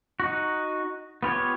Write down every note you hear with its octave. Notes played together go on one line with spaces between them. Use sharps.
D#4 F#4
B3 F4 G4 C#5